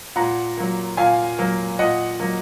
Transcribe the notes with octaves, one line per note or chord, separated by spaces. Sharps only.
A#2 F#5 A#5
F#3 A#3
A#2 F5 G#5
F#3 A#3
A#2 D#5 F#5
F#3 A#3